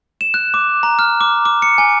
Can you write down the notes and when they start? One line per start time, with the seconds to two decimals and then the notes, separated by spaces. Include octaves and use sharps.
0.21 E7
0.34 F#6
0.54 D6
0.83 A#5
0.99 F6
1.21 D6
1.45 D6
1.62 C#7
1.78 G#5